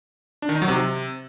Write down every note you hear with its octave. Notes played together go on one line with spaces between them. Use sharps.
D4
D#3
D#4
F#3
C3